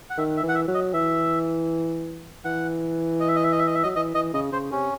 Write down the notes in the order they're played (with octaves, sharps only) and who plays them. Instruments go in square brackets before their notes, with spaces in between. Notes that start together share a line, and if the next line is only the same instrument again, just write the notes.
[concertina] F#5
[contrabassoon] D#3 [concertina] E5
[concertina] E5
[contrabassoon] E3
[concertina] F#5
E5
[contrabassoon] F#3
[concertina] D#5
[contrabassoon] E3 [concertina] E5
[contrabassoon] E3 [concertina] F#5
[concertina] D#5
E5
D#5
E5
D#5
E5
D#5
E5
[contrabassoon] F#3 [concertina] D#5
[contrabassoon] E3 [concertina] D#5
[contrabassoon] E3 [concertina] D#5
[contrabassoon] C#3 [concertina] D#5
[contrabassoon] C#3 [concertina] C5
[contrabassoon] C3 [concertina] C#4